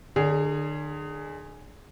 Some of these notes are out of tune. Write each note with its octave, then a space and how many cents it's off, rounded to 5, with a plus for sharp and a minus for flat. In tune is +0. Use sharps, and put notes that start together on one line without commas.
D3 +45 G#4 +0 D5 -45